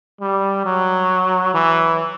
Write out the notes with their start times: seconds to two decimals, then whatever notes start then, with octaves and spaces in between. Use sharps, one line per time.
0.21 G3
0.65 F#3
1.55 E3